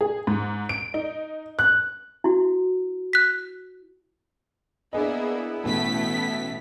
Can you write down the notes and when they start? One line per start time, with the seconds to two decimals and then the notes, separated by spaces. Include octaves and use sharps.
0.01 G#4
0.27 G#2
0.69 D7
0.94 D#4
1.59 F#6
2.24 E4 F#4
3.13 F#6 B6
4.93 A#3 B3 D4 E4 G#4 D#5
5.64 A1 B2 A3 B6